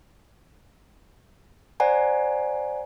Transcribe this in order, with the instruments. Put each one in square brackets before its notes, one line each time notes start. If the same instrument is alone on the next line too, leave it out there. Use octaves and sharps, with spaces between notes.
[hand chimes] C5 D5 F#5 G#5 A#5